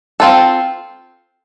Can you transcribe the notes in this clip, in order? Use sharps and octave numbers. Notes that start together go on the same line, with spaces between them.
C4 F4 A4